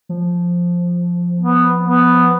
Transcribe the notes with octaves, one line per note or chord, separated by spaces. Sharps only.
F3
B3
B3